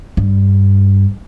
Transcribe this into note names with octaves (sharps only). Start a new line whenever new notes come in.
G2